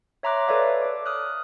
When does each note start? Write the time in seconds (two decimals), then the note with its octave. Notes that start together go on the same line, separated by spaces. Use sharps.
0.23 C#5 E5 A#5 C6 D6 F#6
0.48 A4 B4 C#5 D5 E5 F5
0.82 A4 D6
1.06 D#6 F6 F#6